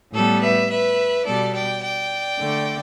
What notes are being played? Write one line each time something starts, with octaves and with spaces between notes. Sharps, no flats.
A2 G3 B3 A4
B4 E5
B4 E5
B2 G3 B3 A4 D5
D5 G5
D5 G5
D3 A3